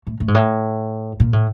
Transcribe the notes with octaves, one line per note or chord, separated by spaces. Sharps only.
A2
A2
G#2
A2
A#2
A2